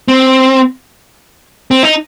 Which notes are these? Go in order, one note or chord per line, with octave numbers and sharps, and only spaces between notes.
C4
C4
D#4